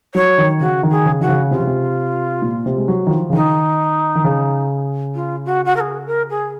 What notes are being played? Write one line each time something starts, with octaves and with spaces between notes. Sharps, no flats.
F#3 C#5
D#3
C#3 F#4
D#3
G#4
C#3
D#3 F#4
C#3
C3 F4
C#3
C3
A#2
C3
G#3
F#3
D#3
F3
C#3
D#3 D#4
D#3
C#3
F4
F#4
F#4
A#4
G#4
A#4
G#4